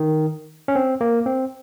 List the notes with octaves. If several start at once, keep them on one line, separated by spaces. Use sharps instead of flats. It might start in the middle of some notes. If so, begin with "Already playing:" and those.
Already playing: D#3
C#4
C4
A#3
C4